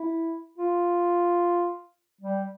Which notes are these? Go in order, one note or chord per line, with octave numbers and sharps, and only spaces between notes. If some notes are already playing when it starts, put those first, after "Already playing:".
Already playing: E4
F4
G3